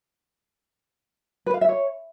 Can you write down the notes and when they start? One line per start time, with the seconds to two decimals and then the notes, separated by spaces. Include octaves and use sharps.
1.46 B4
1.54 F5
1.61 E5
1.69 C#5